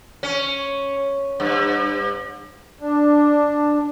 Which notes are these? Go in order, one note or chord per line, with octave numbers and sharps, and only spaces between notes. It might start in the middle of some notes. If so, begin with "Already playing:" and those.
C#4
G2
D4